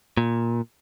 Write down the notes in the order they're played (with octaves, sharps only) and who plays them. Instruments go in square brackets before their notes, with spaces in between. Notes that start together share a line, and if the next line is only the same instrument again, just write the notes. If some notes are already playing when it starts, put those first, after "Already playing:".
[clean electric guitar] A#2